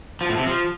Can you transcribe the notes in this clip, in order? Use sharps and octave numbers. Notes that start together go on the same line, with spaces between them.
F3
A2
C3
F3